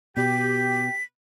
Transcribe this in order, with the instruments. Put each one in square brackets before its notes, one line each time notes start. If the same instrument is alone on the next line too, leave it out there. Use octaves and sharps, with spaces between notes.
[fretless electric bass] B2 [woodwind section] G4 G5 [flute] B6